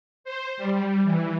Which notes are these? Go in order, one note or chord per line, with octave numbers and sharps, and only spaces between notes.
C5
G3
E3